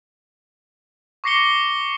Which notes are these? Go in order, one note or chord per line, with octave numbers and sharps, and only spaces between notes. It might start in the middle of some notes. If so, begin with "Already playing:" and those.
C#6 D6 A#6 C7 C#7 G7